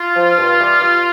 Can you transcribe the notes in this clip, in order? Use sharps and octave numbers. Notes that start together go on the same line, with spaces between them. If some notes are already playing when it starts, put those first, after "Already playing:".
Already playing: F4
F3
G2
E3 G3
G2